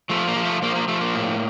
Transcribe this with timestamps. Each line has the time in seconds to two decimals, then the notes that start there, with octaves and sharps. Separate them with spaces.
0.10 F3 A3
0.27 A#3
0.36 F3
0.45 A3
0.62 F3 A#3
0.75 A#3
0.88 F3 A3
1.01 A#3
1.14 A2